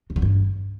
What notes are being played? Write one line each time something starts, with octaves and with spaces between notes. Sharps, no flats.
C3
D3
G2